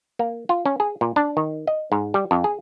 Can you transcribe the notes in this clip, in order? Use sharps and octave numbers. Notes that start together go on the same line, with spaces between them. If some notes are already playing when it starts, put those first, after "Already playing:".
A#3
F4
C#4
G#4
A#2
D4
D#3
D#5
G#2
G3
F2
G#4